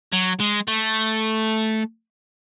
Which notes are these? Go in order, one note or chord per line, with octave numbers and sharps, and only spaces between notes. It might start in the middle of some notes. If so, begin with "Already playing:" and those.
F#3
G#3
A3